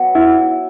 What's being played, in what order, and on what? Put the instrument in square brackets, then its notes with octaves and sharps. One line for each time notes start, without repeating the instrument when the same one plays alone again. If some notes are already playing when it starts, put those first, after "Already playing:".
Already playing: [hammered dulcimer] F#3 B3
[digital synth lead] E4